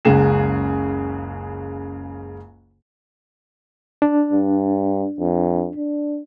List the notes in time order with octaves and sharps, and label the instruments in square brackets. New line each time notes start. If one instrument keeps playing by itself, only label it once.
[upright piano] F#1 C#2 C#3 G#4 E7
[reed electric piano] D4
[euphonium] G2
F2
D4